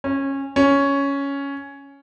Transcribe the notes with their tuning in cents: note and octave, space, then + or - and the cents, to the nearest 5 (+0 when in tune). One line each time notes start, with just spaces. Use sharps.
C#4 -20
C#4 +5